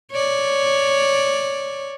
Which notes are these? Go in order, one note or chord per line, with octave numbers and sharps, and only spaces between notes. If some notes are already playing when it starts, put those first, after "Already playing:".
C#5 D5